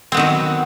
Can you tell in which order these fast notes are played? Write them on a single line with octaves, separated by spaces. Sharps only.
C4 B3 D#3 F#3